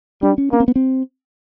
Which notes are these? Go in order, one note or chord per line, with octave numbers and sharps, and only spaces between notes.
G3 D4
C#4
A#3 C#4
C4
B3
C4